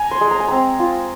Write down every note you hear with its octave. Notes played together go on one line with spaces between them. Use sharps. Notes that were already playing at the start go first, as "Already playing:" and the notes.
Already playing: G#5 A#5
C6
G#3
A#5
G#5
C4 A#5
F4